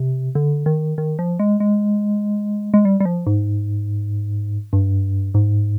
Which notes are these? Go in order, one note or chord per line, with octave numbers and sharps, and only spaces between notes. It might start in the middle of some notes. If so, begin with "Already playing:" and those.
Already playing: C3
D3
D#3
D#3
F3
G#3
G#3
G#3
G3
G3
F3
G#2
G2
G#2